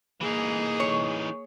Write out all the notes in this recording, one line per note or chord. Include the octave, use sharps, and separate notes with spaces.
E3 A#3 D#4 G#4
C#5